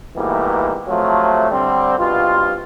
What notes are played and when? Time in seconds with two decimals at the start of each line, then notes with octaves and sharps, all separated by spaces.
0.16 G#2 B2 E3 G3 A3 A#3
0.88 C3 F3 F#3 A3
1.52 D3 G3 C4
1.99 C2 G2 B2 F4